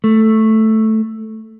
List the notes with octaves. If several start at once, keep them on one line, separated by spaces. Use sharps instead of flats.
A3